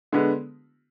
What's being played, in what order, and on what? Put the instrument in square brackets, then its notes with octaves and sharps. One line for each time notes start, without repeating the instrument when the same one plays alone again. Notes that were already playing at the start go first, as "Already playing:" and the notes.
[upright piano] D3 G#3 B3